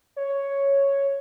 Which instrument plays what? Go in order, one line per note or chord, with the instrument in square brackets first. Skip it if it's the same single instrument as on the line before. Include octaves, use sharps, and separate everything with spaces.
[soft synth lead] C#5